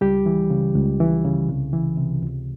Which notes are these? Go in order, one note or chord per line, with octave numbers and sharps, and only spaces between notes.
C#2 G3 G4
E3
C#3
C#2
E3
C#3
C2
E3
C3
C#2